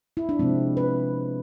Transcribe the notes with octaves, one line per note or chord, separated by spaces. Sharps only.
E4
D4
C3 F3 G#3 C4
B4